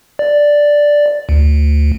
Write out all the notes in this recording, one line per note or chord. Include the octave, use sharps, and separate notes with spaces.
D5
D2